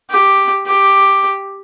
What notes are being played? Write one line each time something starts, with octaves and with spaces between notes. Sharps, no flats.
G4
G4